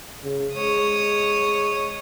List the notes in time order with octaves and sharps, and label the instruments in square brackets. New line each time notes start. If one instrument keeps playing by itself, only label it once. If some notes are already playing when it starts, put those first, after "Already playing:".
[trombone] C#3
[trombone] G#3 [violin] C#5 D#6